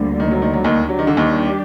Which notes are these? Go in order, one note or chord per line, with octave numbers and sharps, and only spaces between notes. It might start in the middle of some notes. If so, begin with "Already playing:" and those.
Already playing: D2 D3 G3 A#3
D#3
F#3
D#3
F#3
D#2 D#3
F#3 G3 D4 G4
D#3
D3
D#2 D#3